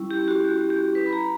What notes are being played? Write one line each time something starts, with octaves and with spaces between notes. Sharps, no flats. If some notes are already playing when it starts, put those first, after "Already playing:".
Already playing: G3 C#4 E4
G4
F#4
G4
F#4
G4
B4
B5
A#5